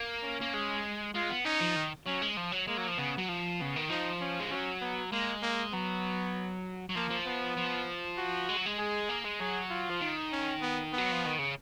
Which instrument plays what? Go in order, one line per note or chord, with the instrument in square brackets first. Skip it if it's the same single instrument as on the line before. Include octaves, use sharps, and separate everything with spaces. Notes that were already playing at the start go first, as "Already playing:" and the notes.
Already playing: [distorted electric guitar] A#3
[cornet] C#4
[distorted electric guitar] A#3
G#3
[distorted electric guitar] G#3 [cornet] F4
[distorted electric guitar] B3
[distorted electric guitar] C#4 [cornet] D#4
[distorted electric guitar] F3
D#3
[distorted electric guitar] F#3 [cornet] C#4
[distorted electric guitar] G#3
F3
F#3
[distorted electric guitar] G#3 [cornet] A#3
[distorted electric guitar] F#3
F3
[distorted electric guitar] C#3 [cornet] B3
[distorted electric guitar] F#3
F3
[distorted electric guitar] C#3 [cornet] B3
[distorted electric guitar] D#3
[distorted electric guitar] F3 [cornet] D#4
[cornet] C#4
[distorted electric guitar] G#3
[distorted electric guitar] F#3 [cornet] C#4
[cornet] B3
[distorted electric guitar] G#3 [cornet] A#3
[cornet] A#3
[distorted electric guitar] F#3 [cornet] B3
[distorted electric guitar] F#3
[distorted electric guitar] F3 [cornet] A#3
[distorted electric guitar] F3
[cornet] B3
[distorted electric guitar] F3
[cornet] F#4
[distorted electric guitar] G#3
F#3
G#3
[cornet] G#4
[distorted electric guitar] A#3
G#3
[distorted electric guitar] F#3 [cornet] G#4
[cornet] F4
[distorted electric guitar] F3
D#3
[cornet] C#4
B3
[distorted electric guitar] F#3 [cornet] B3
[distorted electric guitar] F3
D#3
C#3